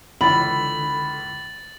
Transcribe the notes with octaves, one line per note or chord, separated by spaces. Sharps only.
C#2 D3 E3 B5 A6 F#7